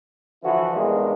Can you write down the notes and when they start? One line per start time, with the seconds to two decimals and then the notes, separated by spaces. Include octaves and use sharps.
0.43 D3 E3 F3 E4 F#4
0.74 B1 E2 G2 G#3 A#3